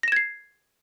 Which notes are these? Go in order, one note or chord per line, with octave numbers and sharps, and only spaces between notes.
G#6 A#6 C7 E7